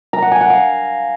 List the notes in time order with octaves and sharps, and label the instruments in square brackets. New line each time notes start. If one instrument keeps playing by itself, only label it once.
[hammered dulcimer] A#5
F#5
G#5
F#5
F5